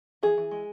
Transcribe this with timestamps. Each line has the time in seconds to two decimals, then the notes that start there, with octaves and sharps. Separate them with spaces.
0.23 E3 G#4
0.38 E3
0.51 G#3